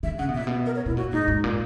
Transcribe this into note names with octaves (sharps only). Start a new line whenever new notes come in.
D#3 E5
C#3 F#5
B2
A#2 E5
B2
A#4
C#5
B2 E4
A#2 F#4
G#2 D#4
G#2
A#2